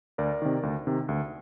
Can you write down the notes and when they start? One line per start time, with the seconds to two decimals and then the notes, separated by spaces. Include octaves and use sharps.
0.18 D2 A#4 D5
0.42 C3 D#3
0.63 D2
0.87 C3 D#3
1.09 D2